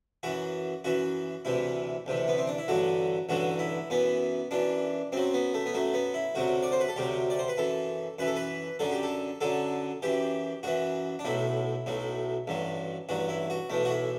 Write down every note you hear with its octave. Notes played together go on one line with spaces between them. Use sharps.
F#2 E3 F#4
F#2 E3 F#4
D2 C3 E3 E4
D2 C3 E3
B3
C4
D4
E4
A1 G2 D3 F#3 F#4
A1 G2 D3 F#3 F#4
E4
F#2 E3 B3
F#2 E3 D4
F#2 F#3 C4
B3
A3
B3
F#2 F#3 A3
B3
E4
D2 C3 F#3 F#4
D5
C5
B4
A4
D2 C3 F#3 G4
D5
C5
B4
F#2 E3 A4
F#2 E3 B4
A4
B4
F#2 D3 F#3 A4
G4
A4
F#2 D3 F#3 A4
F#2 E3 G4
F#2 E3 F#4
D4
B1 A2 F#3 E4
B1 A2 F#3
A1 G2 F#3
A1 G2 F#3 F#4
E4
F#4
B1 A2 E3 A3
F#4
E4